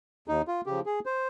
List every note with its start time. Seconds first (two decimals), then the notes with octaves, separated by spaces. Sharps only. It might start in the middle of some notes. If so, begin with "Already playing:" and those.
0.28 D#2 D#4
0.48 F4
0.66 C#3 F3 G4
0.86 G#4
1.06 C5